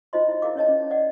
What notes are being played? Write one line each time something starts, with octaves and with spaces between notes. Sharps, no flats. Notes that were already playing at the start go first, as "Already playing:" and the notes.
D#4 F4 C5 D#5 C6
E4 D#5
E4 G#4 A#4 F5 D6
C#4 C#5 D#5 A5
C#4
D5 D#5 F#5